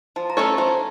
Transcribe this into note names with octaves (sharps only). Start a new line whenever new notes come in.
F3 A5
A#5
A3 C#4 A4 C#5
A5
F3 A#5